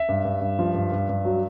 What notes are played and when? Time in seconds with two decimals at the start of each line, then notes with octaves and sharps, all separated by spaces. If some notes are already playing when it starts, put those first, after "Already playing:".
Already playing: E5
0.09 G2
0.25 G2
0.41 G2
0.59 F3
0.74 G2
0.92 G2
1.09 G2
1.25 F#3